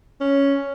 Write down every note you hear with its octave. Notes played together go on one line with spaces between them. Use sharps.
C#4